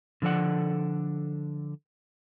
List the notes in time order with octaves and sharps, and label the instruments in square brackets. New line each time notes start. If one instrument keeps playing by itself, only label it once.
[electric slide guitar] D3 F3 A4 D5 F#5